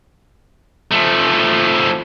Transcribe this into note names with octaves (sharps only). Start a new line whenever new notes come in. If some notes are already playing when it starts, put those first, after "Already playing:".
F3 A3